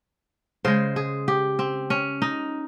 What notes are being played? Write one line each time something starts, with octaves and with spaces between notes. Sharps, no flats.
C#3 G#3 C5
G#4
G4
C4
C#4
D#4